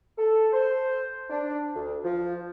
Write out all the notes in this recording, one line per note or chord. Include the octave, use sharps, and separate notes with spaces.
A4
C5
D4
D2
F3